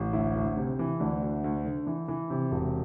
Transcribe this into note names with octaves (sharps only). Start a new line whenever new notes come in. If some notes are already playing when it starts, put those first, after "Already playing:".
Already playing: A1
D2 E4
D2
C3
E3
D2 D4
D2
D2
D3
E3
E3
C3
E1